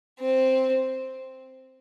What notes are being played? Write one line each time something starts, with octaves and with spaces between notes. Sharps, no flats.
C4